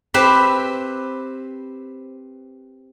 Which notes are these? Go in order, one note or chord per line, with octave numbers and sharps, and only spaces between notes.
C4 G4 B4 C5 E5